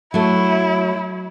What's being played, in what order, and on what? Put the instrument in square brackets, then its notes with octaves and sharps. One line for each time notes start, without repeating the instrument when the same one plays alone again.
[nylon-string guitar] F#3 A3 [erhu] E4